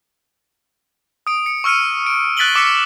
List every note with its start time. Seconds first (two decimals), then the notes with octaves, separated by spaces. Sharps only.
1.27 D#6 D7
1.46 C#7
1.64 C#6 E6 F6 C#7 D#7
2.06 D7
2.37 F#6 A6 B6 D7 F#7 G7
2.55 D6 E6 B6 C#7 E7